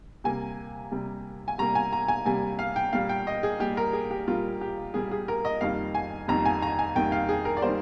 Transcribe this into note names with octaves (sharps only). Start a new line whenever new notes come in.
C3 G3 A#3 G#5
C3 G3 A#3
G#5
C3 G3 A#3 A#5
G#5
A#5
G#5
C3 G3 A#3 G#5
F5
G5
A#2 G3 A#3 F5
G5
D#5
G#4
A#2 G3 A#3 G4
A#4
G#4
G4
A#2 G3 A#3 F4
G4
A#2 G3 A#3 G#4
G#4
A#4
D#5
F2 D#3 G3 A#3 F5
G#5
F2 D#3 G3 A#3 A#5
G#5
A#5
G#5
F2 D#3 G3 A#3 G5
F5
G#4
A#4
D5
D#3 G3 A#3 C5